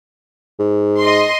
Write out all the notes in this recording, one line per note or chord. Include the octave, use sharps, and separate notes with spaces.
G#2
D#5 C6